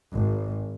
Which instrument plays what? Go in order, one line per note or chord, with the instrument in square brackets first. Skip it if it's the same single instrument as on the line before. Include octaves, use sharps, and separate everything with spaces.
[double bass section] G#1